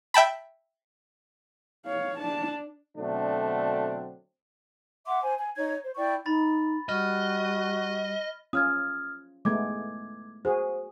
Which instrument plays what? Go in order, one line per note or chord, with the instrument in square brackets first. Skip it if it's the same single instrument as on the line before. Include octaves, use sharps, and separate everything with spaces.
[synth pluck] E5 G5 A5 B5
[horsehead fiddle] C#5 F5
D4 A5
[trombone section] B2 D3 F#3 A3 C4 D4
[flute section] E5 F#5 C6 D6
C5 G#5
G#5
D#4 C#5 G#6
C5
E4 D5 G5 C#6
[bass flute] D#4 [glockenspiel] B5 A6
[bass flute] G3 [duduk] F#4 [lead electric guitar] D#5 [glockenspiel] F6
[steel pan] C#4 F4 [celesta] D#6 F6 G#6
[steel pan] G#3 A3 B3 [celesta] D6 G#6
[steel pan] F#4 G#4 [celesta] C5